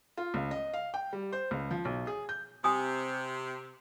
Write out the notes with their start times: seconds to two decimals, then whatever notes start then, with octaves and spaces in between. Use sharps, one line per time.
0.17 F4
0.34 C#2
0.51 D#5
0.74 F5
0.94 G5
1.13 G3
1.32 C5
1.51 C#2
1.71 F3
1.85 B1
2.07 G#4
2.29 G6
2.64 C3 G#5 D#6